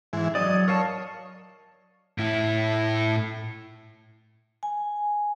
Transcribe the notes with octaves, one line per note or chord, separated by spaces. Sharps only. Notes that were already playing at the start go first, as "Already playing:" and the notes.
G#2 E3
F#3 D5 D#5
A#4 C#5 F5 A5
A2 E4
G#5